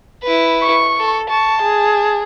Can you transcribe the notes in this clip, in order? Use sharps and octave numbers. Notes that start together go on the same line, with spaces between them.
E4 B4
C#6
A4
A5 C#6
G#4